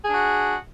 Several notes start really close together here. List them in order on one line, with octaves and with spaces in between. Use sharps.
G#4 D4 F#4